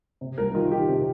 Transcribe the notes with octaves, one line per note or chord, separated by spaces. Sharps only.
C3
C2 A#4
D#3 F4
D#3 G4
C3